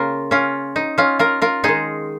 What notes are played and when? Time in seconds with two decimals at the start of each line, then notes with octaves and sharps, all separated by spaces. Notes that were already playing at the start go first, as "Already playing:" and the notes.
Already playing: C#3 A#3 F4 A#4
0.31 C#4 F4
0.76 D#4
0.98 C#4 F4
1.19 F4 A#4
1.42 F4 A#4
1.63 D#3 G#3 D#4 G#4